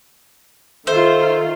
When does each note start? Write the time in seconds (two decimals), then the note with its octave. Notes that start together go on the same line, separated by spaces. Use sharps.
0.87 D#3 F4 A4 C5 E5